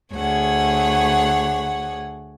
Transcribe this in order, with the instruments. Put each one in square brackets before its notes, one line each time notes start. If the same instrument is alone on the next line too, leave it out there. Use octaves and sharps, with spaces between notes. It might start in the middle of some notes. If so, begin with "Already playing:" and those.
[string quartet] D2 G#4 C#5 F#5